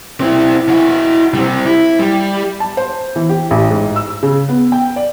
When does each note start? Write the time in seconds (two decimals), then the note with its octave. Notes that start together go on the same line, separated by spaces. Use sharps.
0.21 C4 E4
0.69 E4 F#4
1.34 G3 C4
1.66 E4
1.99 G3
2.60 A5
2.77 C5
3.16 E3
3.29 G4
3.51 A1
3.70 G#2
3.96 E6
4.23 C#3
4.49 B3
4.72 G5
4.96 D5